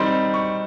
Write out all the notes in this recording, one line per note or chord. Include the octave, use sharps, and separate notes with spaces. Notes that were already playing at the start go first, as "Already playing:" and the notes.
Already playing: D#3 G3 C4 D#4 C6
C#6